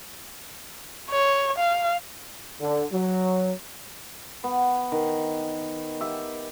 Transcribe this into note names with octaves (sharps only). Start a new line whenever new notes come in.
C#5
F5
D3
F#3
B3
D#3
G4 E5